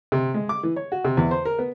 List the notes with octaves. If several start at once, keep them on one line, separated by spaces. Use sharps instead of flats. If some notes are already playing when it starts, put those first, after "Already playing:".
C3
G#3
D6
E3
C#5
F#4
C3
E2
C5
A#4
B3